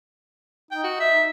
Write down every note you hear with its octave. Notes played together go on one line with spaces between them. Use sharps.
D#4 G5
F#4
E5